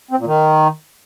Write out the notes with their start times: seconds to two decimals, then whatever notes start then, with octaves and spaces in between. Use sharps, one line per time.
0.11 C4
0.18 A#2
0.26 D#3